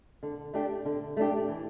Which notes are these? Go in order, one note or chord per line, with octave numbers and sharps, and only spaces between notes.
D3
A3 D4 G4
D3
A3 D4 G4
E3